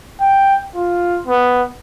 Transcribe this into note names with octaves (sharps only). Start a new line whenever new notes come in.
G5
F4
B3